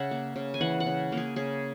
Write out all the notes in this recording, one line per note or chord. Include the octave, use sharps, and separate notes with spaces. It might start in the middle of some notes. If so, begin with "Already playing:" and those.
Already playing: C#3 E5 F#5
A#3
C#3
G#5
E3 F#5
F#5
C#3
A#3
G#4
C#3 G#4